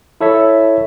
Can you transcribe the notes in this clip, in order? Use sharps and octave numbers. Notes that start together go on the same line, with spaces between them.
E4 A4 C#5 E5